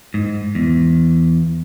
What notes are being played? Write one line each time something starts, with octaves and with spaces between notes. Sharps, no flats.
G#2
E2